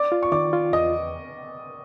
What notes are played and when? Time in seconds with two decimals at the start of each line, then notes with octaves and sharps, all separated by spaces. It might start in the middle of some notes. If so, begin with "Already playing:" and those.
Already playing: D5 D6
0.12 F4
0.23 C#6
0.32 D#3 D5 D6
0.53 F4
0.73 E2 D#5 D#6